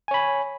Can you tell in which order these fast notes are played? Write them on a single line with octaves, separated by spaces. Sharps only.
G#5 C#5 B5